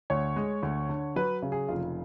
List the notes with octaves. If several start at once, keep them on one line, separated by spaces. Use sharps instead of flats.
D2 C#5
G#3
D2
D3
F#3 B4
C#3
G#4
F1 F4